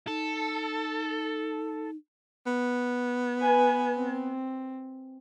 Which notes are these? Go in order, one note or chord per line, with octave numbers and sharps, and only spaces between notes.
D#4 A4
B3
B4 G#5
C4